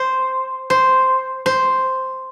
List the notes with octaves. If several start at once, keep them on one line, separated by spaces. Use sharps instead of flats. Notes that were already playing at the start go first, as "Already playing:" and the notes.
Already playing: C5
C5
C5